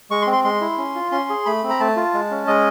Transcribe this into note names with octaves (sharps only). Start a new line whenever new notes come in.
G#3 C#6
C6
C4
C6
G#3 C6
E4
C#4
F4
C#4 C6
G#4
A3 B5
C4
A#5
A3 A5
F4
G#3
C#4
G#3 D#5